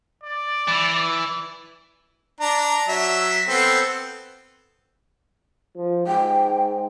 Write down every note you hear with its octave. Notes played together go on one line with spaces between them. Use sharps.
D5
E3
D4 A#5
F#3 E5
B3 C4 A4
F3
G#2 G5